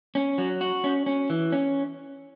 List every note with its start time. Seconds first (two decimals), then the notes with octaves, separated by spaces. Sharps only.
0.15 C#4
0.38 F#3
0.61 F#4
0.84 C#4
1.06 C#4
1.30 E3
1.52 C#4